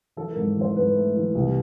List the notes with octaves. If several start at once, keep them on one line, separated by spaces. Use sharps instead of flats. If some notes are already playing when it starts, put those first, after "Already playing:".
E3 A4
G#2 A#4
E3 C5
G#2 B4
A3
E3
C2